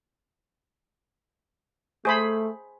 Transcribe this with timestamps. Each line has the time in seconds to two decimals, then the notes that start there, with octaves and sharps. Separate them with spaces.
2.05 A3 G#4 C5 B5